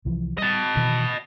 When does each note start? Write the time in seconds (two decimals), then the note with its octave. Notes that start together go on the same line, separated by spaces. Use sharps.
0.05 C2 E3 F3
0.38 G3 D#5 A5
0.76 B2 D#3 E3